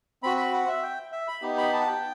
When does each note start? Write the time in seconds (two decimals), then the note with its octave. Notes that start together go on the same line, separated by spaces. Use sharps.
0.23 C4 F#4 B5
0.37 B5
0.53 F#5
0.68 E5
0.83 G5
1.12 E5
1.28 B5
1.42 B3 D#4 G4
1.58 B5
1.73 A5
1.80 F#5
1.88 G5